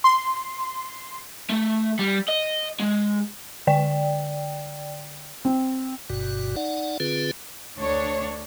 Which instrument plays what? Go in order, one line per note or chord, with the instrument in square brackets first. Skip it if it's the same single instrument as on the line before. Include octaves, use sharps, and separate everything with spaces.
[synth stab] C6
[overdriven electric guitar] A3
G3
D#5
G#3
[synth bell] D3 D5 G5
[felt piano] C4
[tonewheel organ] G1 G2 B2 F#4
D#4 D5 F#5
D3 C4 F4 G#4 B4
[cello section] D2 D4 C#5